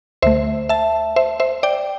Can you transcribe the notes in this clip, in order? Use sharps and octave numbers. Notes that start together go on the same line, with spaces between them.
D2 D3 A3 C5 E5
E5 A5
C5 E5
C5 E5
D5 G5